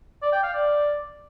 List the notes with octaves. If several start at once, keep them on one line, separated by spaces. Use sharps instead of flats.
D5
G5
F5
D5